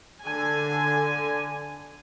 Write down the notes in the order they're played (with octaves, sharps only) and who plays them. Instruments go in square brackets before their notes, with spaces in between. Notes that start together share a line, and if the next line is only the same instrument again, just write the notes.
[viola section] D3 G#5